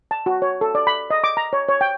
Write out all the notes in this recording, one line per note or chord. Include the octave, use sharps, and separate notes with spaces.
A5
F#4
C#5
A4
D5
B5
D#5
D6
A#5
C#5
C#5
G5